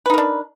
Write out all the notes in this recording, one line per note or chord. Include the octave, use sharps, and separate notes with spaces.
D4 D#4 A#4 B4